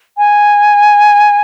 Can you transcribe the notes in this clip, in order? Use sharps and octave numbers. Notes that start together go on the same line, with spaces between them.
G#5